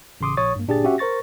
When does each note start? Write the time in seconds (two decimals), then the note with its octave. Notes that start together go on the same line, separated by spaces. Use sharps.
0.21 A1 C#3 C6 D6 D#6
0.37 A#1 C#5 C#6 D#6 A6
0.55 G2 A#3
0.67 G1 A#2 D4 G4 G#4 A6
0.84 C#4 F#4 G4 E5 F#5
0.98 A#4 C5 C#6 A6 A#6